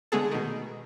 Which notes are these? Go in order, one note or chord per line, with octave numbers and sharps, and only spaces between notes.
D3 G#3 A3 B3 G#4 A4
B2 D#3